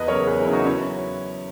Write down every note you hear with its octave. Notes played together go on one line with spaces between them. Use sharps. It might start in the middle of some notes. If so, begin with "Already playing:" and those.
Already playing: E2 B4 D#5
C#3 F#3 A#4 C#5
E2 G#4 B4
E4 G#4
C#3 F#3
D#4 F#4
C#4 E4